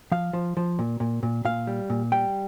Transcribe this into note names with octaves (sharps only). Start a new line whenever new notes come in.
F3 F5
F3
F3
A#2
A#2
A#2
A#2 F5
G3
A#2
G3 G5